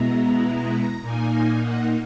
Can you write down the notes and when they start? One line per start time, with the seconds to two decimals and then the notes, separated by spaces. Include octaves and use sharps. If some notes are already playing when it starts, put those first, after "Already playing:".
Already playing: B2 G#3 B3 E4 A#5
0.43 A#5
0.72 A#5
1.02 A#2 A#3 D#4 G#5
1.60 F#5